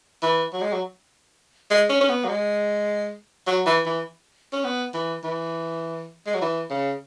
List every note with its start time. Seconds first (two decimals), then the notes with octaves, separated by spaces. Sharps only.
0.22 E3
0.53 F#3
0.62 G#3
0.72 F#3
1.70 G#3
1.89 C#4
2.01 C#4
2.09 B3
2.24 F#3
2.28 G#3
3.47 F#3
3.66 E3
3.86 E3
4.53 C#4
4.64 B3
4.94 E3
5.24 E3
6.26 G#3
6.34 F#3
6.41 E3
6.70 C#3